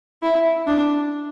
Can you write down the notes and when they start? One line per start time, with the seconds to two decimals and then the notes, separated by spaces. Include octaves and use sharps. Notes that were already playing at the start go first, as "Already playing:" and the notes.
0.22 E4
0.67 D4